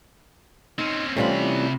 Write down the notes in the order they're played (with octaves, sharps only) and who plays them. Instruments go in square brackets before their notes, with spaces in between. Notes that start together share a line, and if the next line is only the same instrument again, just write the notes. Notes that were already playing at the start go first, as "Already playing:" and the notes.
[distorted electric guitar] C4 C#4 [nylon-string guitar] D#4
[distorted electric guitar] C3 B5 [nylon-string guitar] E3 G3 C#4 [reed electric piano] A3 C4 F4